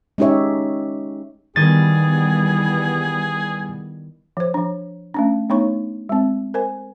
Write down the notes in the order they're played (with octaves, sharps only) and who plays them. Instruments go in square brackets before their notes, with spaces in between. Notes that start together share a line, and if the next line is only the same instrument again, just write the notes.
[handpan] G#3 C#4 D#4 G4 C#5 E5
[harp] D#3 D#5 G#6 [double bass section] E3 G3 B3 [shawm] G#4 [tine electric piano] A6
[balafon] F3 C5
F3 D4
A3 C#4 D4
A3 B3 D4 D#4 C#5 C#6
G#3 C4
A#4 C5 G#5